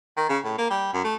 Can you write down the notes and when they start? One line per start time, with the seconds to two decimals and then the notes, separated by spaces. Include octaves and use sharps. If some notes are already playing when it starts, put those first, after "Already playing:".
0.17 D#3
0.29 C#3
0.45 A2
0.58 A#3
0.70 G3
0.93 F#2
1.05 A3